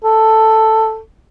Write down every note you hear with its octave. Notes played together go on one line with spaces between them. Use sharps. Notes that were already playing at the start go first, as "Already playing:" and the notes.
A4